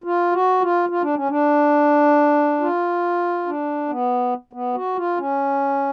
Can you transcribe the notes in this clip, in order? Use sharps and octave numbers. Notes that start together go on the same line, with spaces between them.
F4
F#4
F4
F4
D4
C#4
D4
F4
D4
B3
B3
F#4
F4
C#4